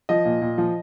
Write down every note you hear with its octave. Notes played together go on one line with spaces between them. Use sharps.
F3 D#5
A#2
A#2
F3